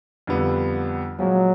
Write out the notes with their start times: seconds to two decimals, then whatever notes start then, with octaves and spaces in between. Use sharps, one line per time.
0.27 F2 D3 G3 B3
1.19 A#2 F3 F#3 G#3